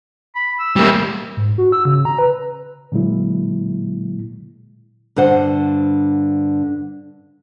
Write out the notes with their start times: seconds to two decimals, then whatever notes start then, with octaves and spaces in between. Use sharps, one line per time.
0.35 B5
0.59 E6
0.76 G3 A#3
1.37 G#2
1.58 F#4
1.72 E6
1.85 C#3
2.05 A#5
2.18 B4
2.92 A#2 D3 F#3 G#3 A#3 E4
5.16 G2 D3 C5 F#5